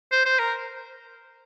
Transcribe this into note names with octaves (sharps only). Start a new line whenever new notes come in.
C5
C5
A#4